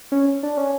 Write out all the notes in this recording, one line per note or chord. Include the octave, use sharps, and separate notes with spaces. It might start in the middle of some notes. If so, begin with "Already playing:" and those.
C#4
D4
C#4